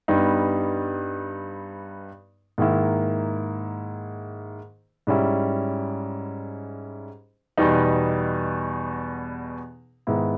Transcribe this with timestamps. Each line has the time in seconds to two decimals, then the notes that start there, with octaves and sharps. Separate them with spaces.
0.08 G2 G3 B3 D#4
2.58 G#2 D#3 A#3 E4
5.07 G#2 G3 C#4 E4
7.58 E2 B2 G3 B3 D#4
10.07 G#2 D#3 G#3 B3 E4